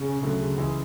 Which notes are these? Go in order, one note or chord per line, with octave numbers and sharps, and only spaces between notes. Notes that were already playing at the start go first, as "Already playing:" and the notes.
Already playing: C#3
D2 D3 F#3 A3
C#2 C#3 E3 G#3 C#4